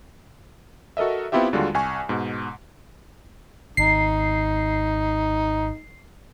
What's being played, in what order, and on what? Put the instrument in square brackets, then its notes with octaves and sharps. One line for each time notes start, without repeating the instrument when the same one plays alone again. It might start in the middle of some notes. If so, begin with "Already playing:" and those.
[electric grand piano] F#4 A4 A#4 D#5 E5
B3 C4 E4 F4 G4 E5
D#2 D3 G3 G#3 F4 F#4
C2 G#5 C#6
G#2 B2
[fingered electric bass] G#1 [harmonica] D#4 [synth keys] C7